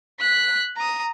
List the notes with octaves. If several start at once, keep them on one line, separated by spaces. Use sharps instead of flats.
F#6 B6
A#5 D#6